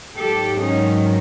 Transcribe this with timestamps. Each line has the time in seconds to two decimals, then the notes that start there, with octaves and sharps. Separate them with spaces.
0.19 G#2 D#3 F#3 G4 A4
0.62 C#4 D#4